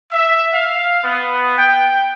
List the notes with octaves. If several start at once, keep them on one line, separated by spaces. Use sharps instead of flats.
E5
F5
B3
G5